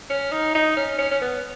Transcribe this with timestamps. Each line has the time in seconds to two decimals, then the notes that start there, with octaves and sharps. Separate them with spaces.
0.10 C#4
0.32 D#4
0.54 D#4
0.76 C#4
0.98 C#4
1.11 C#4
1.21 B3